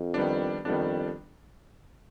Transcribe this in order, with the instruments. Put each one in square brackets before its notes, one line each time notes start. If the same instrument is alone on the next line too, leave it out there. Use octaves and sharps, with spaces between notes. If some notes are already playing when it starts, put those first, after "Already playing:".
Already playing: [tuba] F2
[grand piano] D#3 G3 B3 D4
[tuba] F2 [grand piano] D#3 G3 B3 D4